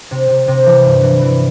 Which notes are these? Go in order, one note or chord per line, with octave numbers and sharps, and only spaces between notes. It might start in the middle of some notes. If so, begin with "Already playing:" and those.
C3
C3
C3
E3
G2
E3
E3